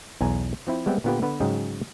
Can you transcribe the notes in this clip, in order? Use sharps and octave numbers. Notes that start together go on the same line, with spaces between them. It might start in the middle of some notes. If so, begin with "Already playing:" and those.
B1 E2 G#5 A#5
F3 C4 E4
G3 G#3 B3 C4 E5 G5
A#2 D3 B3 F4 G4 B4
D3 B3 B4 F#5
G#2 C#3 F#3 G#4 D#5 G5